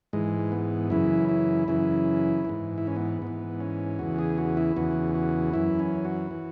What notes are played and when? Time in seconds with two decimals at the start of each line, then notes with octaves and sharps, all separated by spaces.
0.13 G#2 E3 G#3
0.52 B3
0.90 F#2 C#3 E3 E4
1.29 E4
1.68 F#2 C#3 E3 E4
2.45 G#2 E3
2.78 E4
2.87 C#4
2.96 B3
3.22 G#2 E3 B3
3.60 C#4
3.99 E2 C#3 E3 F#4
4.19 G#4
4.38 F#4
4.57 E4
4.76 E2 C#3 E3 F#4
5.15 F#4
5.53 F#2 E3 E4
5.79 C#4
6.05 F#4
6.31 E3